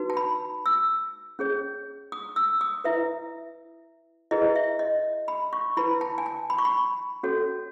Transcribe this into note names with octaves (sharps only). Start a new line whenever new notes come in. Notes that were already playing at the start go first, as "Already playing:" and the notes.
Already playing: D#4 F#4 B4
A5
B5
E6
C#4 G#4 C#5
D#6
E6
D#6
E4 B4 E5
E4 G#4 B4 D#5
E5
D#5
B5
C#6
E4 B4 B5
A5
G#5
A5
B5
C#6
B5
C#4 F#4 A4 C#5